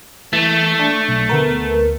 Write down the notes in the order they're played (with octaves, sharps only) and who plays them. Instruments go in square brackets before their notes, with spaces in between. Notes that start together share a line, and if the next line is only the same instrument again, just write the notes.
[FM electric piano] E3 [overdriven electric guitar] A3
[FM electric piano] D4
B1
D2 B3 A#4